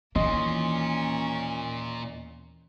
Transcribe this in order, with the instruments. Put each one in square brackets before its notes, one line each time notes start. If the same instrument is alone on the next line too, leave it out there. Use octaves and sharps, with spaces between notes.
[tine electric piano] D#2 D#5 C6 [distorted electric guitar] A#2 [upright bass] E3 [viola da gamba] A#3 C#4